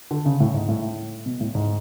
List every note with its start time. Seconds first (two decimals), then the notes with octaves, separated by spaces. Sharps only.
0.11 D3
0.26 C#3
0.40 A2
0.54 G#2
0.69 A2
1.26 B2
1.41 A2
1.55 G#2